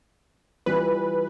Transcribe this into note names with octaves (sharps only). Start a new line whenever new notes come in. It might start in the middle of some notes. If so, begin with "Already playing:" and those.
E3 G3 F4 B4